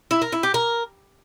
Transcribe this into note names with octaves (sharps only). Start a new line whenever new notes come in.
E4
A#4
E4
G4
A#4